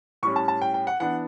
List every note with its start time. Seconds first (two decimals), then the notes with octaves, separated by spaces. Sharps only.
0.23 A2 G3 C#4 C#6
0.36 A5
0.48 A5
0.61 G5
0.74 G5
0.87 F#5
1.00 E3 B3 D4 F#5